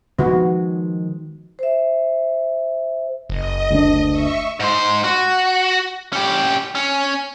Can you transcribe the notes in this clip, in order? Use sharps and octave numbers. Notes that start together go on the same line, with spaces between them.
D#3 F3 G#3 B3 F#4
C5 E5
F#1 D#5
D2 G3 D4
E5 C#6
G#2 C5
F#4
C#4 G4
C#4